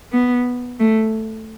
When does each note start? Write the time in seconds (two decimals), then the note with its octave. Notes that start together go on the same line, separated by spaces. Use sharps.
0.12 B3
0.79 A3